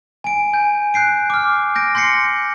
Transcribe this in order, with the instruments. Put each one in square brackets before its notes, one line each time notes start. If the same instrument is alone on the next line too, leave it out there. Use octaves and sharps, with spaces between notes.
[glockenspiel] G#5 D7
G#5 G6
F#6 G6 C7 D7
D6 F6
G6 A#6 D7
C6 G6 A#6 C7 C#7